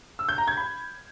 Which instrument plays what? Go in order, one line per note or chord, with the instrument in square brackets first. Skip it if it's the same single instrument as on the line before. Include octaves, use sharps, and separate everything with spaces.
[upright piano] E6
G6
A#5
G#6
B5